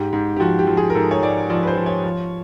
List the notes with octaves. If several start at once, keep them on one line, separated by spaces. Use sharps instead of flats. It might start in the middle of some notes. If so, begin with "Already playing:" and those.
Already playing: G#2 G4
G#2
G4
F3 F#4
G4
F3
G#4
A#4
G#2 A4
C#5
G#2 D5
F3 D5
B4
C5
F3
C#5
F3